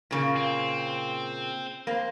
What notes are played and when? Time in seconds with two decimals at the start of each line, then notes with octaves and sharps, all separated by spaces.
0.11 A#2 C#3 A#3
0.36 C4
1.87 A#3 C4